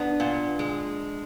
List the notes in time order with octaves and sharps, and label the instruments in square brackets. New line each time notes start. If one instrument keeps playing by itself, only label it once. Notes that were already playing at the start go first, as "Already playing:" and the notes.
Already playing: [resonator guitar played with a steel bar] B3 [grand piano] D4
[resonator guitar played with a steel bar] A#2
G#3